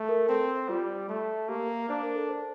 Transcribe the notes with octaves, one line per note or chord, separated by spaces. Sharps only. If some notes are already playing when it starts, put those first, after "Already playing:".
Already playing: A3
A#4
C4 A4
G3 F4
A3
A#3 G4
A#4
D4 C5
A#4
A4
C5